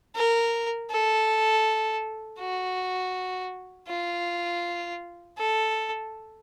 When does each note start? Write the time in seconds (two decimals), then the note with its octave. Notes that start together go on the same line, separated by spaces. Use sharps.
0.16 A#4
0.91 A4
2.39 F#4
3.88 F4
5.38 A4